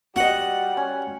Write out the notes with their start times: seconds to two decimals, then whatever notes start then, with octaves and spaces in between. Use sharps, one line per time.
0.16 G3 F#4 D#5 F#5
0.77 C#4